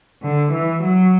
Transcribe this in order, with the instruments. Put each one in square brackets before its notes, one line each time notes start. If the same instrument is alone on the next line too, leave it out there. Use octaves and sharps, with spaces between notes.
[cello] D3
E3
F#3